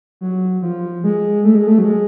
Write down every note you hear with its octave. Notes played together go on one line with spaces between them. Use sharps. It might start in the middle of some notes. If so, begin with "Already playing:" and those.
F#3
F3
G#3
A3
G#3
A3
F#3
G#3